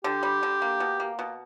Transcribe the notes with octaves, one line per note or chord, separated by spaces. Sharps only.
D3 G4
G3
D3
A#3
B2
A#3
B2